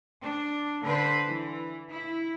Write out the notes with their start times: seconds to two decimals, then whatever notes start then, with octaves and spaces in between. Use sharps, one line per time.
0.21 D4
0.82 D3 B4 C5
1.26 E3
1.89 E4